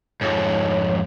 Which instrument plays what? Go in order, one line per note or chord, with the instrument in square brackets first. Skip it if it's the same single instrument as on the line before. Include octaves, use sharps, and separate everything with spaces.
[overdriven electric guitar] F2 G#2 [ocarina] C#5